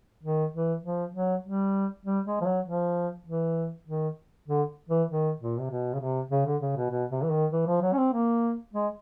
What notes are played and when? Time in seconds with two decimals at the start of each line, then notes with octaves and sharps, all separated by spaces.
0.23 D#3
0.53 E3
0.84 F3
1.14 F#3
1.44 G3
2.06 G3
2.26 G#3
2.41 F3
2.46 F#3
2.66 F3
3.26 E3
3.87 D#3
4.48 D3
4.89 E3
5.09 D#3
5.40 A#2
5.60 C3
5.70 B2
5.94 C#3
6.00 C3
6.31 C#3
6.46 D3
6.61 C#3
6.76 B2
6.91 B2
7.11 C3
7.22 E3
7.32 D#3
7.53 E3
7.67 F3
7.82 F#3
7.93 C#4
7.98 C4
8.13 A#3
8.73 G#3